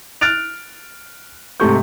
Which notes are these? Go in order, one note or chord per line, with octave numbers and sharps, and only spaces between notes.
F6 F#6 A6 D7 F7
G#2 C3 A3 C6 C#6 G6